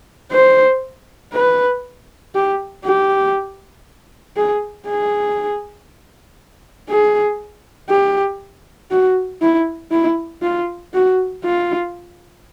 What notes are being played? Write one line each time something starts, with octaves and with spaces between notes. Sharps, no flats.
C5
B4
G4
G4
G#4
G#4
G#4
G4
F#4
E4
E4
F4
F#4
F4